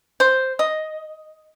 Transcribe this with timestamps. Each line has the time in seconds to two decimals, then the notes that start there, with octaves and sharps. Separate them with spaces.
0.20 C5
0.59 D#5